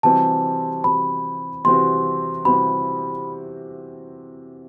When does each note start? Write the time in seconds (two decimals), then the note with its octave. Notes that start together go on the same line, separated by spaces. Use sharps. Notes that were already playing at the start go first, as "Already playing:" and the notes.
0.03 C3 E3 G3 C4 F#4 A5
0.84 C3 E3 G3 C4 F#4 B5
1.64 C3 E3 G3 C4 F#4 C6
2.45 C3 E3 G3 C4 F#4 B5